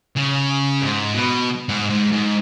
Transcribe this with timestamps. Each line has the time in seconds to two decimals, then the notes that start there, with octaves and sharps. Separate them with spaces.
0.17 C#3
0.82 G#2
1.14 B2
1.69 G#2
1.90 G#2
2.13 G#2